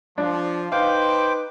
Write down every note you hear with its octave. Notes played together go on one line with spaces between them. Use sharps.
F3 D4
D#4 B4 C5 F5 G5 D6